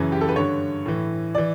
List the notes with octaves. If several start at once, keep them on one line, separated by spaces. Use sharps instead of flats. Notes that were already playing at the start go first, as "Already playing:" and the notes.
Already playing: F#2 C#3 E3
G4
A4
B4
G2 D3 C#5
A2 E3
E3 D5